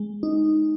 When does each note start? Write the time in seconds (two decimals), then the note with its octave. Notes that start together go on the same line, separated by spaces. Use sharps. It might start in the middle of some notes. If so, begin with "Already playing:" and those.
Already playing: G#3
0.23 D#4